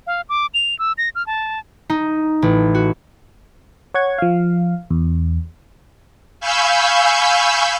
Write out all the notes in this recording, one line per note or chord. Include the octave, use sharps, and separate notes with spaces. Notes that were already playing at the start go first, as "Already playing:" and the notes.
F5
D6
F7
E6
A#6
F6
A5
D#4
A1
F#4
C#5 F#5 C#6 G#6
F3 F5
E2
F5 G#5 B5 C#6 E6 G6